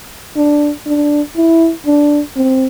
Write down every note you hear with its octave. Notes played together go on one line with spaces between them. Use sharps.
D4
D4
E4
D4
C4